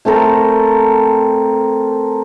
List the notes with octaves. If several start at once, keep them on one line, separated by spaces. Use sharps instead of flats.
A3 C4 A4 A#4